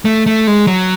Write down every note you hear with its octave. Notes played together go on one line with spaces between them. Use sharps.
A3
A3
G#3
F#3